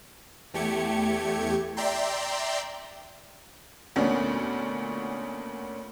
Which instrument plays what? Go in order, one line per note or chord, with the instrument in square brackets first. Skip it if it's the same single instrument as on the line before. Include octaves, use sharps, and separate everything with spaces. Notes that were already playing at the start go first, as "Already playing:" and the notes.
[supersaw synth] E2 A3 G4 G#6 C#7
D5 E5 G5 A#5 C6
[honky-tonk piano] D2 A#2 A#3 B3 C#4 D4